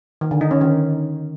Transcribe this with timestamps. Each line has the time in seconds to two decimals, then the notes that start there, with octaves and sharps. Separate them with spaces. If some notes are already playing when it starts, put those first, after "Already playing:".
0.21 D#3
0.31 D3
0.41 D#4
0.51 C#4
0.61 D#3